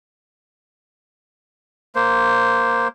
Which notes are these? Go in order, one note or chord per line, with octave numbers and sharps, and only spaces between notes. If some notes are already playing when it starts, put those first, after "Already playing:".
A#3 C5